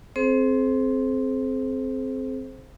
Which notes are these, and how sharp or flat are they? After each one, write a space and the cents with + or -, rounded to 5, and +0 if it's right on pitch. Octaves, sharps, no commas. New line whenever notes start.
C4 +0 G#4 +45 C5 +0